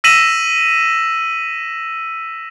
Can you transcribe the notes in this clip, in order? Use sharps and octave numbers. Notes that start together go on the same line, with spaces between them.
E6 A#6 B6 D#7 E7 F#7